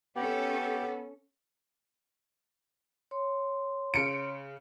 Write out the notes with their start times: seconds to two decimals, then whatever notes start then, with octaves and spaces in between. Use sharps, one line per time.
0.16 B3 C#4 G4 A4
3.11 C#5 C6
3.94 C#3 C#7 D7